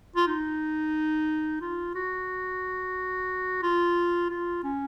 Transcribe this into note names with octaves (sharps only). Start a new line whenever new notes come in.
F4
D#4
F4
F#4
F4
F4
C#4